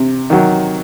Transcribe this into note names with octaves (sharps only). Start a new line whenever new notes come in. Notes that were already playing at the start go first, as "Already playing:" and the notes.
Already playing: C3
D#3 F#3